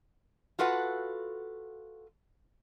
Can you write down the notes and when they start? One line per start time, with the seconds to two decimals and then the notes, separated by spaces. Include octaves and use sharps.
0.59 F4 F#4 A4 B4 F#5